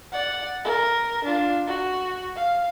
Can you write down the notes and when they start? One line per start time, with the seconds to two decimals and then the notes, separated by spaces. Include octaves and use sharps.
0.12 D5 F#5
0.65 A#4
1.24 D4 F4
1.67 F#4
2.36 F5